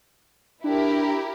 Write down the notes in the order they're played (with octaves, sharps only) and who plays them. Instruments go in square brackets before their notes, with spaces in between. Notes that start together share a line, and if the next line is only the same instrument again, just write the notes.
[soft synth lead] D4 [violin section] E4 G4 A#4